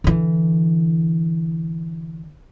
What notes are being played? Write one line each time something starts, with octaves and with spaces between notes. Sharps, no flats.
D3 E3